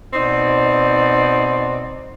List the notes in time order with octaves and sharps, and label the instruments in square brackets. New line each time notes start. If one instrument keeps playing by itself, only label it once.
[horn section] B2 C4 D#4 D5